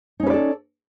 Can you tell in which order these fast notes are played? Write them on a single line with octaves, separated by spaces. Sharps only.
D#4 C#4 B4 D5 A4